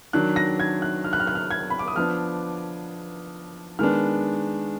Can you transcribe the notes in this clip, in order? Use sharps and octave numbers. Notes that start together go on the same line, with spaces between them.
D#3 F#3 D4 F#6
A#6
G#6
F#6
F6
F#6
F6
F#6
F6
G#6
B5
D6
D#6
F3 B3 D4 F6
D#3 G#3 B3 D4 F6